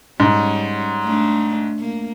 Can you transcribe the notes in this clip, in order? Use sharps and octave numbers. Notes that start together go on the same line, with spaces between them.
G#2 G3 C#4
A3 D4
A#3